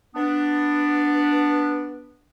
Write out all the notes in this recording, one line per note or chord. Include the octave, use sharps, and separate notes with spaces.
B3 D4